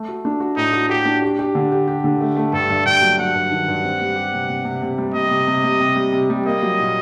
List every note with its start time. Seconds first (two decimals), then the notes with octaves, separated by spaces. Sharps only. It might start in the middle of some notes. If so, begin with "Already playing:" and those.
Already playing: A3
0.08 F#4
0.25 D4
0.40 F#4
0.57 A2 D#4
0.73 F#4
0.89 F#4 G4
1.05 D4
1.22 G4
1.39 G4
1.55 D3
1.72 G4
1.87 G4
2.04 D3
2.21 A3
2.36 A3
2.53 G2 A4
2.70 G2
2.86 G2 G5
3.02 F#3
3.18 F#3 F#5
3.34 G2
3.51 D#3
3.68 G2
3.84 C4
4.01 G3
4.16 G4
4.34 C3
4.49 C3
4.65 C3
4.82 C3
4.98 G3
5.14 G3 D#5
5.31 C3
5.47 C3
5.64 G3
5.80 C3
5.96 G3
6.13 C3
6.30 G3
6.45 A#3 D#5
6.62 F#3
6.79 A#2